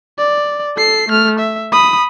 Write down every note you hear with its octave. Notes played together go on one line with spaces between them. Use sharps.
D5
A4 C7
A3 F6
E5
B5 D#6